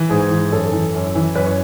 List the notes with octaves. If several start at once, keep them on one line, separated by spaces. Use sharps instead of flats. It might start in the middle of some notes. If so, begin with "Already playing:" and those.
Already playing: E3
G#2 G#4
E3
F#2 A4
E3
F#2
E3
F#2 B4
C#5